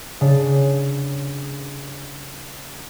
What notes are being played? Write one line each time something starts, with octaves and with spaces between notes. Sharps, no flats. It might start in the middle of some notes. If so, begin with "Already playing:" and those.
C#3 D4